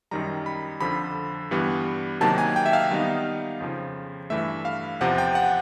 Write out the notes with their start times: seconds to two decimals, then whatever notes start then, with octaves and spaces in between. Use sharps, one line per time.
0.11 F#2 D#3 G3 A#5
0.46 B5
0.81 F2 D3 F3 B5
1.51 G2 E3 G3 B3
2.21 C3 D#3 F#3 A#3 A5
2.38 G#5
2.56 G5
2.66 E5
2.73 F5
2.91 D#3 G3 B3 D#4
3.61 F2 C#3 F3
4.30 G2 E3 A3 E5
4.65 F5
5.01 E2 C3 F3 F#5
5.18 G5
5.35 F#5